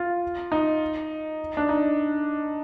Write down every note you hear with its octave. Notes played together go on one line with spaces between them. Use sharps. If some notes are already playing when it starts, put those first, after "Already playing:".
Already playing: F4
D#4
D4
D#4